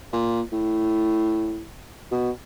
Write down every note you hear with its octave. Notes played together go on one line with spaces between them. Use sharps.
A#2
A2
B2